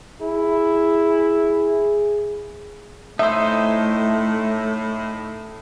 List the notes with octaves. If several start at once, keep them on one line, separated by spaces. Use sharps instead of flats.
E4 G#4
A2 A3 D#4 C5 E5